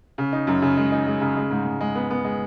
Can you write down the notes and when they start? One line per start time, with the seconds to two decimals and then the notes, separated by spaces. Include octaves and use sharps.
0.18 C#3
0.32 D#4
0.47 F#2
0.62 C#3
0.77 G#3
0.92 D#4
1.07 G#3
1.21 C#3
1.37 G#3
1.51 G#2
1.65 G#2
1.81 G#3
1.95 B3
2.10 B3
2.24 G#3